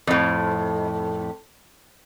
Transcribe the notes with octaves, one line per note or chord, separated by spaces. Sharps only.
F2 A2